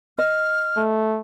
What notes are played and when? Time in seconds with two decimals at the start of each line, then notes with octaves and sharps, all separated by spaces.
0.18 D#5 F6
0.77 A3